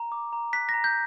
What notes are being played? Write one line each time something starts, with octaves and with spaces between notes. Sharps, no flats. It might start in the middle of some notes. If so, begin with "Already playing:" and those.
Already playing: A#5
D6
A#5
F#6 B6
A#5 A#6
G6